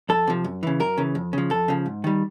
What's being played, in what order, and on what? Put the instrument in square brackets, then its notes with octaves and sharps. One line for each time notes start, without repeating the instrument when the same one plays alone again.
[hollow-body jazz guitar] F2 A4
C3 F3
F#2
C#3 E3
F#2 A#4
C#3 E3
F2
C#3 F3
F2 A4
C#3 F3
G#2
D#3 G3